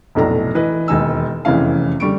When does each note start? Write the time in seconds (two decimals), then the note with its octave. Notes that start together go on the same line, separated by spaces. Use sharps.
0.15 F1 B1 A2 D4 A4 A#5
0.55 E3 B4 D#5
0.88 E1 D#2 D#4 G#5 E6
1.45 F1 E2 C3 E3 C#4 F5
2.00 D3 G3 C#6 D7